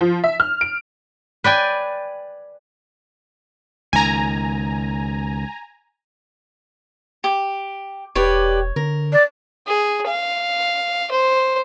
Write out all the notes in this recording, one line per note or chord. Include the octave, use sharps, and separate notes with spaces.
F3
E5
F6
D7
B4 D5 G5 G#5
C#2 D#3 G#5 A#5
G4
E1 G4 B4 C#5 D5
D3 A#4
D5
G#4
F5
C5